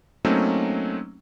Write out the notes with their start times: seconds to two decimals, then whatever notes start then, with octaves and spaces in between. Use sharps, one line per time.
0.25 F#3 A3 A#3 C4 C#4 D#4